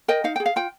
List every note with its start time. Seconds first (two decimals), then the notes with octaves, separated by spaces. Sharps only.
0.08 A#4 D#5 G5
0.24 D#4 F5
0.36 G#4 G5
0.46 F5
0.56 F4 G5